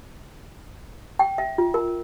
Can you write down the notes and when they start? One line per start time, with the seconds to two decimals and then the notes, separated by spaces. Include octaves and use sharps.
1.19 G5
1.38 E5
1.58 F4
1.74 A#4